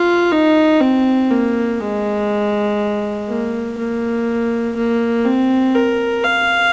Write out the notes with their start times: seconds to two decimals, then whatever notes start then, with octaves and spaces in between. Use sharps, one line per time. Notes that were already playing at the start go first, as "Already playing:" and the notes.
Already playing: F4
0.31 D#4
0.81 C4
1.31 A#3
1.80 G#3
3.28 A#3
3.78 A#3
4.76 A#3
5.25 C4
5.75 A#4
6.23 F5